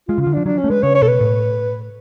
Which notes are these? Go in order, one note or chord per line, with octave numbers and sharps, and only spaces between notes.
G#3 F4
C#3
F4
D3
D4
F3
F#3 D4
C#4
A3
G#3 B4
C#3 C#5
C#5
B2 A4
B4
A2